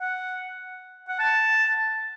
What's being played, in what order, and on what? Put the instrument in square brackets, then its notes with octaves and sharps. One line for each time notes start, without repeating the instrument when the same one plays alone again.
[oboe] F#5
F#5
A5